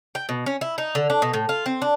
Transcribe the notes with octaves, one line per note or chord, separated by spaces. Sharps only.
G5
B2
C#4
E4
D#4
D3
D4
B2
A2
F4
C4
D4